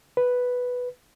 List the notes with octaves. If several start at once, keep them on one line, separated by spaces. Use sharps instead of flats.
B4